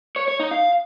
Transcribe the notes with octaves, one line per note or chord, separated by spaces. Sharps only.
C#5
C#5
D#4
F5